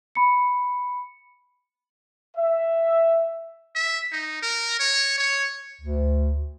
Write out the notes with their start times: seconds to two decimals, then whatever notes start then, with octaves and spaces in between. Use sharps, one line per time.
0.15 B5 C#7
2.37 E5
3.75 E5
4.12 D#4
4.42 A#4
4.79 C#5
5.18 C#5
5.80 D2